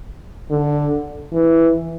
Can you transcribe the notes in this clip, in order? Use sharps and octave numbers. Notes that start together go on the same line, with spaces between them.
D3
E3